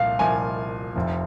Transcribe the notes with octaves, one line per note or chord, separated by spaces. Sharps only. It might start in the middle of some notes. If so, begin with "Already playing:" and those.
Already playing: C2 A#2 F3 F5
C2 A#2 F3 G#5
F1 F2 F3